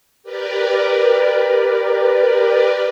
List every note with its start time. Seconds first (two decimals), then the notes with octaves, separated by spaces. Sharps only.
0.23 G4 A#4 B4 D5